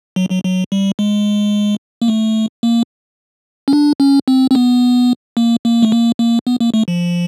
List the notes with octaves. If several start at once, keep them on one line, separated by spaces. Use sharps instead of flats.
F#3
F#3
F#3
G3
G#3
A#3
A3
A#3
C#4
D4
C#4
C4
C4
B3
A#3
A#3
A3
A#3
A#3
B3
A#3
A3
F3